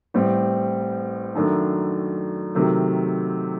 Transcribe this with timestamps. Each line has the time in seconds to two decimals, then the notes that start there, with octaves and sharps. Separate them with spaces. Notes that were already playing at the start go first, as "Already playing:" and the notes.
0.14 A1 A2 G3 C4
1.35 F#2 D#3 A3 D4
2.55 C3 D#3 F#3 A3